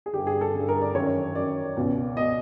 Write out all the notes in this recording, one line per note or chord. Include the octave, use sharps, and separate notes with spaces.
G#4
G2 D3 G4
G#4
A4
G2 D3
A#4
D5
F#2 D#3 C#5
F#2 D#3 D5
C#2 B2
B2 D#5